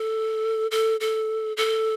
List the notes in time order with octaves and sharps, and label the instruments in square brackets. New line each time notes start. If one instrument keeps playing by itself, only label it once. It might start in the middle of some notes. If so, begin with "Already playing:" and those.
Already playing: [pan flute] A4
A4
A4
A4